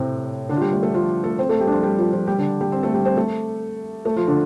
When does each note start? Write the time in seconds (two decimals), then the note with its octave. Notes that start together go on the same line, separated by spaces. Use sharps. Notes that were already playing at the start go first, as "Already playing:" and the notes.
Already playing: A2 C3 A3 C4
0.49 D3 D4
0.57 F4
0.61 G3 G4
0.72 A3 A4
0.83 A3 A4
0.94 F3 F4
1.23 A3 A4
1.39 C4 C5
1.49 A3 A4
1.61 G3 G4
1.67 D4
1.72 F3 F4
1.83 G3 G4
1.98 F3 F4
2.12 F3 F4
2.27 G3 G4
2.38 D3 D4
2.61 G3 G4
2.72 C4 C5
2.83 A3 A4
2.94 G3 G4
3.05 C4 C5
3.16 A3 A4
4.05 A3 A4
4.16 F3 F4
4.27 D3 D4